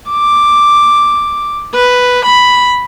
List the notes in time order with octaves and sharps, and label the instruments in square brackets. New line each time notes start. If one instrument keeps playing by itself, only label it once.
[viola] D6
B4
B5